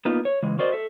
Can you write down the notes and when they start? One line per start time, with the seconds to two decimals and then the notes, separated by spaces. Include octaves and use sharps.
0.05 A#3 B3 D#4 F4
0.25 C#5
0.43 C#3 E3 G#3
0.59 F#4 A#4 C5 D5 D#5
0.72 A4 E5